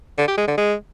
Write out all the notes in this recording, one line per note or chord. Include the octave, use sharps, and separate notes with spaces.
D3
G4
G#3
D3
G#3